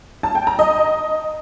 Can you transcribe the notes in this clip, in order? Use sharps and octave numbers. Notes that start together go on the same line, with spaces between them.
A5
G5
A#5
D#5